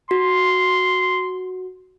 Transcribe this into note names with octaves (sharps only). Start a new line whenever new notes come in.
F#4 C6